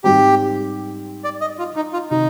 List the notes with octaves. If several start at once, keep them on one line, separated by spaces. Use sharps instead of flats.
G#2 G3 C4 G4
D5
D#5
F4
D#4
F4
C3 D#3 D#4